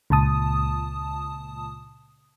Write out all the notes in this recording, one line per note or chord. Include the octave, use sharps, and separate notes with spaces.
C#2 A#2 A5 D#6